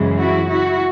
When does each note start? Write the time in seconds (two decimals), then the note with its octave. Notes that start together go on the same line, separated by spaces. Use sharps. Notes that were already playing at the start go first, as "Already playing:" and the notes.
Already playing: F#2 C#3 E3 G#3
0.18 E4 F#4
0.49 E4 F#4